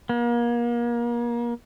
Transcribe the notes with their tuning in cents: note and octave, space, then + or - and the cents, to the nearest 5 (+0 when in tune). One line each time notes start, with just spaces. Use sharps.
A#3 +35